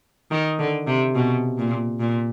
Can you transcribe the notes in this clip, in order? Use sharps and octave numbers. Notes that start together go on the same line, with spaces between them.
D#3
D3
C3
B2
A#2
A#2